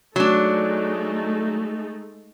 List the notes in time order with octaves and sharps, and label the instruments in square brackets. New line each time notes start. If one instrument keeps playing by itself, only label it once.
[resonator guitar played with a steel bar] F#3 D4 [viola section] G#3 A3 D#4